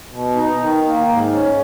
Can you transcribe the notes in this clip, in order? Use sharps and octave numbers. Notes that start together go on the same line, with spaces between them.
B2
D#4
D#3
A#3
G#2
C#4